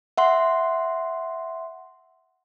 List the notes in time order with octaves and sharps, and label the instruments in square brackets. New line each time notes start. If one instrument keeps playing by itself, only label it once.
[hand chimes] E5 F#5 C6